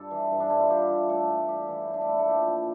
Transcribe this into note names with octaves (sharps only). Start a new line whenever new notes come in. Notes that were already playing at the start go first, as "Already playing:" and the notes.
Already playing: G2 G3 A4
E3
G2
D4
G2 E4
F4
G3 G4
E3
A2 A4
A2
G3 G4
E3
A2
D4
E4
A2
A4
A#2 G4
F3